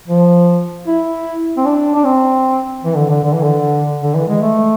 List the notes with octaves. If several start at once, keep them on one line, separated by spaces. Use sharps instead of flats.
F3
E4
C4
D4
D4
C4
E3
D3
D3
D3
E3
D3
D3
E3
G#3
A3